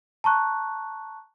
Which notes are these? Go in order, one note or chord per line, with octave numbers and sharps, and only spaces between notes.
A5 A#5 C#6 F#6